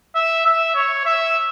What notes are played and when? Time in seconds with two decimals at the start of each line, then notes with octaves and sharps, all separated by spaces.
0.15 E5
0.46 E5
0.75 C#5
1.05 E5